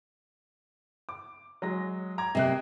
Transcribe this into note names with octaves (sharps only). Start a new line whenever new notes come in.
D6
F#3 G#3 A#6
A#5 D6 G#6
C3 A#3 D#5 F#6